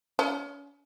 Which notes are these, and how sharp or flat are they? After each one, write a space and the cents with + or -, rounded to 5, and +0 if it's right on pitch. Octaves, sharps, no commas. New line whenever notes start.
C#4 +35